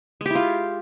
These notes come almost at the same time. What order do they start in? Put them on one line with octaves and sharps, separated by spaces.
G#3 G4 E4 F4